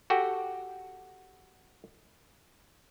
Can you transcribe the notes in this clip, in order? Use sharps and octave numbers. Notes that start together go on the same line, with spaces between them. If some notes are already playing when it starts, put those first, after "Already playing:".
F#4 G4 A4 G5